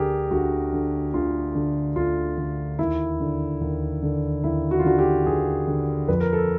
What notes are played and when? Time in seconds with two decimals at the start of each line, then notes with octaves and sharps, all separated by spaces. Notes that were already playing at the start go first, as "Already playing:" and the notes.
Already playing: D2 D3 G4 G#4 A#4
0.31 D2 F#4
0.73 D3
1.14 D2 F4
1.55 D3
1.96 D2 F4
2.38 D3
2.79 D#2 E4
3.20 D3
3.61 D#2
4.02 D3
4.44 D#2 E4
4.71 F#4
4.79 F4
4.85 D3 F#4
4.99 G4
5.26 D#2 G#4
5.68 D3
6.08 F2 B4
6.20 A#4
6.33 A4